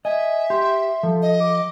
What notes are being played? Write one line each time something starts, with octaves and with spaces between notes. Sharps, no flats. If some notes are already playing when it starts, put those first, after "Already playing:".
D#5 E5 G#5
G4 C6
F3 A4
D#5
D6